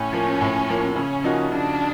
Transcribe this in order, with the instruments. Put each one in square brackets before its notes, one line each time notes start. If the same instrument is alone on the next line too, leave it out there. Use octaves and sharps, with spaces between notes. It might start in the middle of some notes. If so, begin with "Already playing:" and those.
Already playing: [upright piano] A2 [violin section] C#4
[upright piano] F3 A#3
A2
F3 A#3
[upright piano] C#3 [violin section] C#4
[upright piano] F3 A#3 D#4 F#4
[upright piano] C#3 [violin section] D4